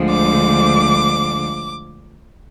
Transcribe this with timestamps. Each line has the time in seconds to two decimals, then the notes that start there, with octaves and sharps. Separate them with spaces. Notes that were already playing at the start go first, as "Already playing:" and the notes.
Already playing: D2 D3 F3 G#3
0.09 D6